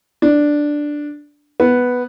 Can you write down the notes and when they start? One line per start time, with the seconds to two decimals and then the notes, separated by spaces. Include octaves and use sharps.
0.22 D4
1.60 B3